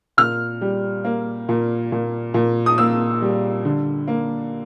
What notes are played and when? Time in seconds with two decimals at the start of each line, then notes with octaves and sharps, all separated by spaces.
0.17 A#2 F6
0.61 G3
1.04 A#3
1.49 A#2
1.92 A#2
2.34 A#2
2.66 D#6
2.78 A#3 E6
3.22 G3
3.65 D3
4.08 A#3